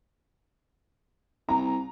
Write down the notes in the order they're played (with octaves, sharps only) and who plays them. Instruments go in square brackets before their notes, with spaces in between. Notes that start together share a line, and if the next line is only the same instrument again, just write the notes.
[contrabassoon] C2 [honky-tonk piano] A#5